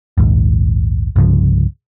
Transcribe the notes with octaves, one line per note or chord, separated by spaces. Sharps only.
A#1 D#2 G#2
C2 G2 C#3 F3